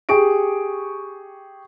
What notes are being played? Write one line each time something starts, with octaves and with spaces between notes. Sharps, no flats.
G4 G#4 C#6 D7